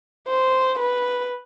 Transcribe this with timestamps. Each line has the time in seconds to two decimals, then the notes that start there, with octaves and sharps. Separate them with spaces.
0.28 C5
0.79 B4